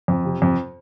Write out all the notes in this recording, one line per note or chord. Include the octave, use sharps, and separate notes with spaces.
F2
C3
F2